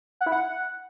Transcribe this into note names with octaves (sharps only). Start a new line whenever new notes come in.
F#5
E4
F#5